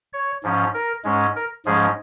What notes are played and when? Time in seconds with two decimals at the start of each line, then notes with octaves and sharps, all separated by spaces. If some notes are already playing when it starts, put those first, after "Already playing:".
0.13 C#5
0.43 G#2 F3 C#4
0.74 A#4
1.04 G#2 G#3 C#4
1.36 A#4
1.65 G#2 F3 G#3 C#4 G#4